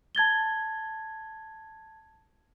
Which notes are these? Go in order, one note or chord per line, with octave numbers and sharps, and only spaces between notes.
A5 G#6 A6 G7